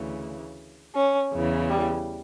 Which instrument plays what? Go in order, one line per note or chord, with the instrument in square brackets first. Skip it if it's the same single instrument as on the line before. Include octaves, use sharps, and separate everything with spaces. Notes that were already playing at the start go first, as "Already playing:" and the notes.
Already playing: [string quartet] D2 C#3 E3
C#4
E2 C#3 E3
G3